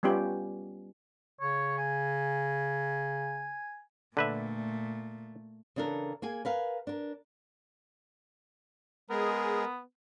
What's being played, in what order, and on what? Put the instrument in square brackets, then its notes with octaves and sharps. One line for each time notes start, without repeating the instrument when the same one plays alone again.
[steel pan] G3 B3 C#4 F4 G4
[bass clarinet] C#3 [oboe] C#5
[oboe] G#5
[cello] A#2 A3 [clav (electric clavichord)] D3 B4 E5
[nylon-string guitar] C#3 E3 D4 A4 A#4
A#3 G#4 G#5
A#4 B4 F5 G#5
D4 A#4
[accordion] G#3 G#4 [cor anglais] B3 [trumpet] A#4